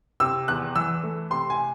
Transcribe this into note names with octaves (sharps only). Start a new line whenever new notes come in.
C3 E6
E2 F#6
E3 E6
A3
C3 C6
G#5